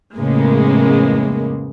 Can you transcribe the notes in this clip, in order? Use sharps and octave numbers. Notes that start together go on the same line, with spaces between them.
F2 A2 C#3 G#3 A#3 B3